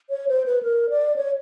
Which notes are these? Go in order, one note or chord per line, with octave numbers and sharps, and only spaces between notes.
C#5
C5
B4
A#4
D5
C#5